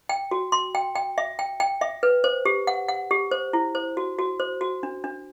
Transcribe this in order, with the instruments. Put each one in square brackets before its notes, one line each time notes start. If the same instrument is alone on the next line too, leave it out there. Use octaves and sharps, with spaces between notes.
[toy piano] G5
F#4
C6
G5
G5
E5
G5
G5
E5
B4
C5
G4
F#5
F#5
G4
C5
E4
C5
F#4
F#4
C5
F#4
D4
D4